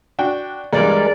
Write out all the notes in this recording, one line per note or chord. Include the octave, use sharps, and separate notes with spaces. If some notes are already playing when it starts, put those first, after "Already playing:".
D4 F#4 G5
E2 G2 G#3 A#4 D5